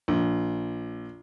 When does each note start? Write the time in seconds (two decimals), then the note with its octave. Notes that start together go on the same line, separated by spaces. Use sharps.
0.08 A#1